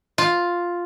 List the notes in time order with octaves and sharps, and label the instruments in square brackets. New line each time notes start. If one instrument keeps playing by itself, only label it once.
[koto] F4